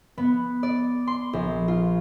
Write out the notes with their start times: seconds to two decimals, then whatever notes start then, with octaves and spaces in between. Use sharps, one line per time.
0.18 B3
0.63 D5
1.07 C6
1.33 A#1
1.68 F4